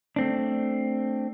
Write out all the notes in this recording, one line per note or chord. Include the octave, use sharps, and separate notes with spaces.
A3 C4 D4